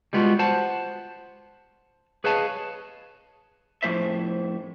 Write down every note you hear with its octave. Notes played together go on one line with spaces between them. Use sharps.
G3 G#3 B3 F4 F#4
C5 F#5 A5
G#4 B4 C#5 D#5 F5 A5
F2 A2 C5 E5